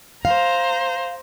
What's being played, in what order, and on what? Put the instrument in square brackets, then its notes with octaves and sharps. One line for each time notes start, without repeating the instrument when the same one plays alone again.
[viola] C5 A#5 [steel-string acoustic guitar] F5